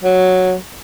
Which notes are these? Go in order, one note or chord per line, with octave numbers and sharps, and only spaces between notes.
F#3